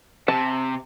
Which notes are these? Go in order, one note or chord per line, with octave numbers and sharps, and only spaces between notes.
C3 A5